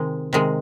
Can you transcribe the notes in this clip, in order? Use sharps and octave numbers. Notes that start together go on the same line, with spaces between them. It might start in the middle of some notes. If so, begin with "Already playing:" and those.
Already playing: C3 D#3 G#3
C3 D#3 G#3